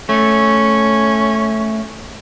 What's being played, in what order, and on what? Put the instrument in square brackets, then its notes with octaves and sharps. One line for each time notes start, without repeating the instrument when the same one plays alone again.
[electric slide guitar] A3 [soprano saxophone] C#4